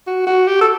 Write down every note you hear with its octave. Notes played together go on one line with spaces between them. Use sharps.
F#4
F#4
G4
A4